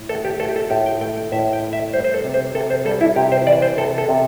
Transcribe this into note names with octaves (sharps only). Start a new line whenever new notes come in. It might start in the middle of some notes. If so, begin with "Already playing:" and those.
Already playing: A2
A3 A4
G4
A3 A4
G4
A4
A2 G4
G5
A3 G5
G5
A2 E5
G5
A3
E5
G3 C5
C5
A4
C3
C5
C3 A4
C5
G3 A4
E4
C3 G4
C5
E3 D5
C5
C3 A4
A4
C3